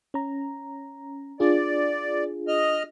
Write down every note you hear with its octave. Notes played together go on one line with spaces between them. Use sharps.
C#4 A#5
D4 F4 G#4 D5
D#5 F6